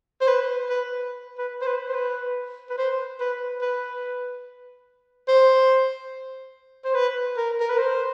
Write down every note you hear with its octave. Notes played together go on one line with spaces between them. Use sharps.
C5
B4
B4
B4
C5
B4
C5
B4
B4
C5
B4
B4
C5
C5
B4
A#4
A#4
B4
C5